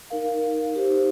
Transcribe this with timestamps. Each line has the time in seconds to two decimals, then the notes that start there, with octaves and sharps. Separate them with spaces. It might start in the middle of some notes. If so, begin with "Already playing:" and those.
0.10 D#4 A#4 F5
0.74 D#4 G4 C5